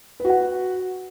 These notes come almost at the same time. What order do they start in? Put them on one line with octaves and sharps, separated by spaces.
B4 F#4 F#5